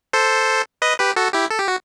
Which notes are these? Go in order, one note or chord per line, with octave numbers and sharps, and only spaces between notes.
A4 C5
B4 D#5
G4 B4
F#4 A4
E4 G4
A4
G4
F#4